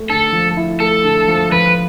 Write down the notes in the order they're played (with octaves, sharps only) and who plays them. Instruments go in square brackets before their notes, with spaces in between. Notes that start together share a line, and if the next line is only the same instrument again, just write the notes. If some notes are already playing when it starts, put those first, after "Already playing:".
Already playing: [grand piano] A3
[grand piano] D3 [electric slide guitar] A4
[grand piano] F3
E4
[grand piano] A3 [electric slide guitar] A4
[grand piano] D3
F3
[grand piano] F3 [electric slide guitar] B4